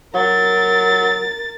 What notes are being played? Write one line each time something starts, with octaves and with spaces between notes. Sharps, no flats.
F#3 A#4 A6